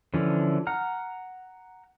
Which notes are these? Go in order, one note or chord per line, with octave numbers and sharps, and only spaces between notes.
D3 E3 F3 C#4
F#5 A#5 F6